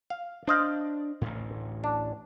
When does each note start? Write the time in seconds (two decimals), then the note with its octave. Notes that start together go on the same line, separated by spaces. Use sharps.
0.10 F5
0.47 D4 C5 D#5 F5
1.21 A1 D2 A2
1.84 D4